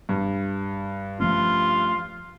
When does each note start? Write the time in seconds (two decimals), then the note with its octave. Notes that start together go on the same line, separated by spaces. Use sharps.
0.09 G2
1.20 F3 A3 C#4 F4